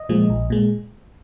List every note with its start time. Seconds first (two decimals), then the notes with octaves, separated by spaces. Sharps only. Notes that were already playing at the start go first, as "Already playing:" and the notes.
Already playing: D#5
0.09 A#2 F3 G#3
0.30 A#1
0.50 A#2 G#3